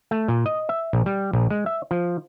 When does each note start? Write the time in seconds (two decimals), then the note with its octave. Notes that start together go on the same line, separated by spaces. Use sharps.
0.11 A3
0.28 A#2
0.46 D#5
0.69 E5
0.93 A#1
1.06 G3
1.33 A#1
1.50 G#3
1.66 E5
1.91 F3